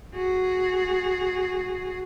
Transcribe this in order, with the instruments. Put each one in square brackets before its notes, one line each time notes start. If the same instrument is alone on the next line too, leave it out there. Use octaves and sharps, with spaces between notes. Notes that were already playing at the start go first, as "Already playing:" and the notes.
[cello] F#4 G#4